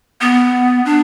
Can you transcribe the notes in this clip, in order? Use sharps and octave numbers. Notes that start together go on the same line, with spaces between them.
B3
D4